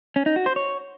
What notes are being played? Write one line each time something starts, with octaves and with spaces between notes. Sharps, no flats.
C#4
D#4
F#4
C5
C#5